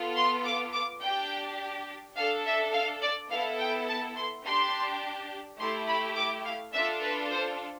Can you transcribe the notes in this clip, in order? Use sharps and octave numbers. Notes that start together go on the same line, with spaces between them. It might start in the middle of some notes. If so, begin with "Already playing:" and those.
Already playing: B3 F4 A4
C6
D6
D6
D4 G4 G5
D4 A4 F5
E5
F5
D5
B3 E4 A4 F5
G5
A5
C6
D4 G4 C6
A3 E4 G4 C6
B5
D6
F5
D4 F4 A4 E5
B4
C5